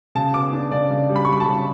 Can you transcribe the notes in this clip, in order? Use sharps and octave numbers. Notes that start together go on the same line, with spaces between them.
C#3 A5
B3 D6
D4
C#3 D5
C#3
G3
B5
C#6
G3 B5
A5
C#3